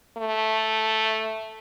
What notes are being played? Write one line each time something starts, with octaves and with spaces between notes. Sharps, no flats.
A3